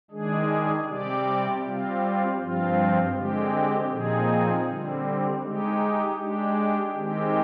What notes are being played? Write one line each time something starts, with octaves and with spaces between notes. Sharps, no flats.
D#3 G#3 D4 G#4
C3 G3 C4 G4 D5
G3 C4 F4
G2 F3 C4 F4
D3 G#3 C4 G4
A#2 F3 C4 D#4 G#4
D3 G3 C4
G#3 D#4 G4
G#3 D4 G4
D#3 G#3 C4 G4